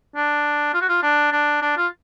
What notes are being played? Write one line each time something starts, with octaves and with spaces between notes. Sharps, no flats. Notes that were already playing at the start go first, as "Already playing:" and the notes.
D4
F4
F#4
F4
D4
D4
D4
F4